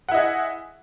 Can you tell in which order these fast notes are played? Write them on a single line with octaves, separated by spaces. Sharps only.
F#5 E4 D#5 G#4